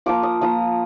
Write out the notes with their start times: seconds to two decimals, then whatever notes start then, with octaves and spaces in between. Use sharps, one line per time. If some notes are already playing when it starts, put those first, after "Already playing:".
0.06 F3 A#3 F4 D6
0.23 D#6
0.41 F3 A#3 F4 D#6